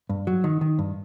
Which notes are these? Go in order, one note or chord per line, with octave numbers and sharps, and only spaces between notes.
G2
F#3
D#3
D#3
G2